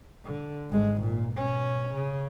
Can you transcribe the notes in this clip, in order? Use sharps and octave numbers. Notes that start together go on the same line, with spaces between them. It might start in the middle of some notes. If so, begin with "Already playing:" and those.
D3
G#1 G#3
A#2
B2 C#4
C#3